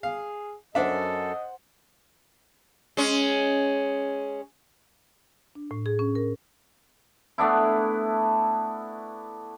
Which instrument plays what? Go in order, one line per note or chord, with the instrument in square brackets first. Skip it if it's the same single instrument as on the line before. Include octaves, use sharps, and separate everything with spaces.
[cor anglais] G#4 [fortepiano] F5
[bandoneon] F#2 A4 [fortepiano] D4 E5 [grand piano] C5 F#5 [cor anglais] D#5
[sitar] G#3 C#4
[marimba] D4
A2
G#4
C#4
A#4
[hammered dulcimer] A3 B3 D4 E4